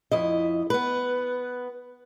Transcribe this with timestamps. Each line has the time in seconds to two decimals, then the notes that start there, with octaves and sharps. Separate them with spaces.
0.11 F2 E4 D#5
0.70 B3 B4